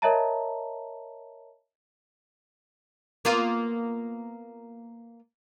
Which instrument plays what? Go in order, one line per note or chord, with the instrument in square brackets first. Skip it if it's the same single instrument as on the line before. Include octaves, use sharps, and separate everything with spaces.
[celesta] A#4 C#5 D#5 E5 A5 A#5
[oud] A#3 B3 F4